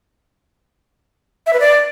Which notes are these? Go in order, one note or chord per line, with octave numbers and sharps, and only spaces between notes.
E5
B4
D5